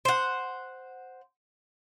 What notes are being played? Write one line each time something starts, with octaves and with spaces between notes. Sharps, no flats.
C5 F#5